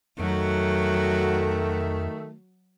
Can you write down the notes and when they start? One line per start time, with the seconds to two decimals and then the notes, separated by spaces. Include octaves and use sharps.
0.19 F2 D#3 F#3 A3 F#4